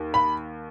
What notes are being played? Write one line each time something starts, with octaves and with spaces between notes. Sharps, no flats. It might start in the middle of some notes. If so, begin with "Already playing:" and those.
Already playing: D#2
B5